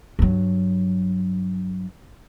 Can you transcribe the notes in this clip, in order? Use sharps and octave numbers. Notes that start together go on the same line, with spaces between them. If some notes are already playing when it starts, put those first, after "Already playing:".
G2 F#3